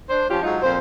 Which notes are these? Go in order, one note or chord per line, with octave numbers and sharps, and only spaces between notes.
D4 C5
F3 C#4 F4 G4
F#3 G#3 D#4 F4
F2 A#2 C5